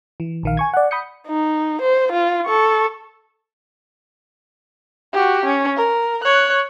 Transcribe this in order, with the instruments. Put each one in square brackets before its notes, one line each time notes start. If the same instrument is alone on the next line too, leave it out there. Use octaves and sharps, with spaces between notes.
[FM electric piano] E3
A#1 D#3 F5
G#5 C#6 G#6
D5 F#5
B5 D#6 G6 C#7
[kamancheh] D#4
C5
F4
A4 C#6
F#4 G4
C#4
A#4
C#5 F#6